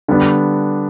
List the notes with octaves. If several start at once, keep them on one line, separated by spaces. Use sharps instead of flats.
D3 G3 B3 D4